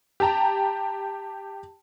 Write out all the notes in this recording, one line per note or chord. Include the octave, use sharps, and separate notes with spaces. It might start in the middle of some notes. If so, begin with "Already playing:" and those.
G4 G5 A5 A#5